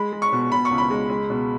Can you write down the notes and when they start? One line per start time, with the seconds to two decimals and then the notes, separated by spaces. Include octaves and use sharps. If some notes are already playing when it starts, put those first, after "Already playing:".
Already playing: G#3 B5
0.12 G#3
0.22 C#6
0.32 B2
0.52 B2 B5
0.65 C#6
0.71 C#2
0.78 B5
0.90 G#3
1.09 G#3
1.30 B2